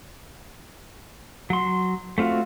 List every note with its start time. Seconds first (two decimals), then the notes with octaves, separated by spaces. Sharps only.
1.50 F#3 C6
2.18 A3 C4 F4 F#4